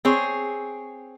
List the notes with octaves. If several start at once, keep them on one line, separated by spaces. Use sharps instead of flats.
C4 G#4 C#5